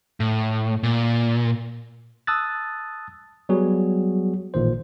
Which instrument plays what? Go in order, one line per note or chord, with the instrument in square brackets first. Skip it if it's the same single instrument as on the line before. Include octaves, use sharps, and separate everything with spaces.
[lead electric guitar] A2
A#2
[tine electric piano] A5 D#6 E6 F#6 A6
F#3 G3 B3 F#4 G#4
A1 A#2 D#3 C5